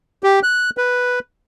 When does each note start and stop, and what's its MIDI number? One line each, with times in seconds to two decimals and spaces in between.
0.23 0.40 67
0.43 0.70 90
0.77 1.19 71